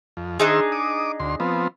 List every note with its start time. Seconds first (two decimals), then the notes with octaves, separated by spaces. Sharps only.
0.17 F2
0.40 D#3 D4 D#4 G#4 C5 E6
0.72 D6 D#6
1.20 D2 C6
1.40 F3 B3 C4